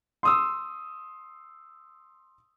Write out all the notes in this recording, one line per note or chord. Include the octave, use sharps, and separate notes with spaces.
C6 D#6 E6